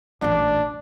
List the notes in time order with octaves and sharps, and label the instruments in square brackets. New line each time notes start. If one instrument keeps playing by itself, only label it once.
[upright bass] D#1 A1 [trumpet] D4